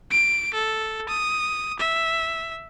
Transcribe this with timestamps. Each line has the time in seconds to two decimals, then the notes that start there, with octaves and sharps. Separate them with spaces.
0.10 D7
0.54 A4
1.09 D#6
1.79 E5